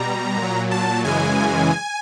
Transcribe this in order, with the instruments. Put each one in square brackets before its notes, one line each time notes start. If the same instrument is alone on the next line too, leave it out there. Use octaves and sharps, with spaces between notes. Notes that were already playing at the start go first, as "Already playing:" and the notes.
Already playing: [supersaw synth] B2 G3 A#5
A#2 F#3
A5
F#2 C#3 E3 G#3 G#5